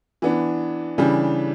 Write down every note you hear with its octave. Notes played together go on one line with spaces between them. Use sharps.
E3 B3 D4
C#3 E3 G3 D4 G4